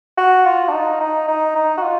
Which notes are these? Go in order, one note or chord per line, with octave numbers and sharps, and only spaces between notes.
F#4
F4
D4
D#4
D#4
D#4
D#4
F#4
F4